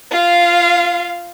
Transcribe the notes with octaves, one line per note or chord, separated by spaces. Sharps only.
F4 F5